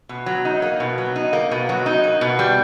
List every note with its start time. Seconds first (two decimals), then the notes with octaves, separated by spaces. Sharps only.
0.09 B2
0.26 F#3
0.45 D#4
0.62 A#3
0.80 B2
0.98 F#3
1.16 D#4
1.33 A#3
1.51 B2
1.69 F#3
1.86 D#4
2.04 A#3
2.21 B2
2.39 G3